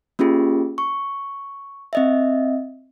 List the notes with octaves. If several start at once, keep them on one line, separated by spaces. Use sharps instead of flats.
A#3 C#4 F4 G4 G#4
C#6
C4 D#5 E5